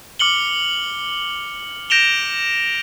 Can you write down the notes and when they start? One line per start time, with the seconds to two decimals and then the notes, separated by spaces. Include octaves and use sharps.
0.19 D6 F6 C#7 F#7 G7
1.90 G6 A#6 D7 E7 F7 G7